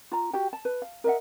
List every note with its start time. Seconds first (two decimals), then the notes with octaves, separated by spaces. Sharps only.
0.12 F4 A#5
0.33 F#4 G4 G5
0.53 A5
0.65 B4
0.82 F5
1.04 A#4 D#5 E5 F#5